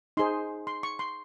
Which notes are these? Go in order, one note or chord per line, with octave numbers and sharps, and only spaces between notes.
D#4 G#4 C5 C6
C6
C#6
C6